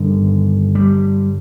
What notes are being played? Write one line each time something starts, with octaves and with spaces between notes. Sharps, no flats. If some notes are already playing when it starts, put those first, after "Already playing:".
Already playing: G2 D3 D#3
G3